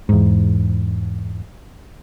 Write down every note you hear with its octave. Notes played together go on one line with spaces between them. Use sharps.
E2 G#2